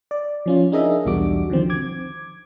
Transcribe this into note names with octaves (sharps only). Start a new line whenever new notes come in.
D5
F3 C#4 F4
D4 D#4 G#4 A#4 D#5 E5
B1 E2 G3 D4 F#4 D6
D3 D#3 F3 C4
D6 G#6